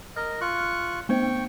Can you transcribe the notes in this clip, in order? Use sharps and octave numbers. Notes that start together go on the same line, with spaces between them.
A#4 D#5 F6
F4 C#6 F#6
A3 B3 C5 G5 C#6